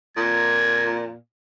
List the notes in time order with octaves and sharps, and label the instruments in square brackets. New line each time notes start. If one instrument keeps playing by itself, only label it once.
[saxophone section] F2 A#2 [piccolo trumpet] G#6